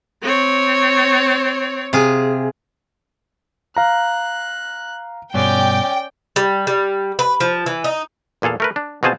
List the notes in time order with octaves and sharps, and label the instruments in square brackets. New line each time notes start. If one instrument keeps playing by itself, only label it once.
[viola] C4 C#5
[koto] C3 F4 G#4
[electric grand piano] F5 A#5 [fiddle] F#6
[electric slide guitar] G2 B2 [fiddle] C#4 D5 [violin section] G5
[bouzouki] G3
G3
B4
F3
E3
D#4
[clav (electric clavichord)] E2 A#2 G#4 A4 F5
A3 A#4 B4
D4
B2 C4 F4 G#4 C5 A5